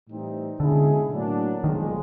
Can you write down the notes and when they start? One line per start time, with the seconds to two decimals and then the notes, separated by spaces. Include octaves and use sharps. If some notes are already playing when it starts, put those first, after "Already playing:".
0.09 A2 E3 G3 C4 D#4
0.60 B2 D3 G#3 C#4 E4 G#4
1.12 A2 F#3 A#3 D4
1.63 B1 A#2 D#3 F3 G#3